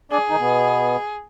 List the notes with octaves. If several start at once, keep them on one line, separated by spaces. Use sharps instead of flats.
D4 G#4 D5
D#3 D#4
B2 B3